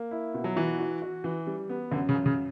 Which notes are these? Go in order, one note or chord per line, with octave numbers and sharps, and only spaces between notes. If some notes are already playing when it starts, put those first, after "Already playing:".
Already playing: A#3
E4
B2
F#3
E3 F#4
F#4
F#4
E3
G3
B3
F#2 D3
C#3
F#2
C#3